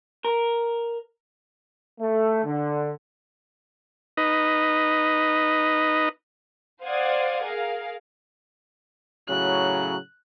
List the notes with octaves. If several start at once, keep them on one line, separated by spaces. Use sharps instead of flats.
A#4
A3
D3
D#4 B4 D#5
C5 D5 F5 F#5 D#6 G#6
G#4 A#4 F5
A2 C#3 F#3 F#6